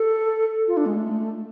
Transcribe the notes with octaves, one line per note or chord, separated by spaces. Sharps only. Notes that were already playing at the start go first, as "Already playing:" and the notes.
Already playing: A4
F4
D4
G#3
A3